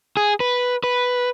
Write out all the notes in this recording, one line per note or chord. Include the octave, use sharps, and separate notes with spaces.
G#4
B4
B4